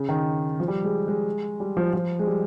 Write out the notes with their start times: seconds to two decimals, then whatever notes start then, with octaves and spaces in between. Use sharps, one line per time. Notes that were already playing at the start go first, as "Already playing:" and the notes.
Already playing: C#3
0.09 D#3
0.60 F3
0.68 G3
0.85 G#3
1.08 G#3
1.60 G3
1.77 F3
1.93 F3
2.19 G#3
2.27 G3